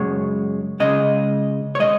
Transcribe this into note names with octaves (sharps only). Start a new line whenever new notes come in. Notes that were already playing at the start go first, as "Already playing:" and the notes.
Already playing: F#2 C#3 G#3 C#5
C#2 C#3 G#3 D#5
C#5
C#3 G#3 D#5